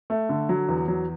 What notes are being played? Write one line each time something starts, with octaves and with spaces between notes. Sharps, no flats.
A3
D3
F#3
E2
F#3